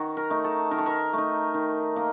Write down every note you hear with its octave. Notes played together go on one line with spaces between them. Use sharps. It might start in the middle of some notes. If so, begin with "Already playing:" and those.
Already playing: D#3 F#4
A#4
A3 D#4
A4
D#3 A#4
A4
A#4
A3 D#4
D#3
A#3 D#4